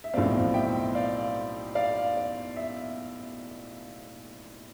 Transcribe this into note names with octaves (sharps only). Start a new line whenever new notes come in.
E5
B1 A2 F3 C4 D5 F5
E5 G5
D5 F5
D5 F5
D5
E5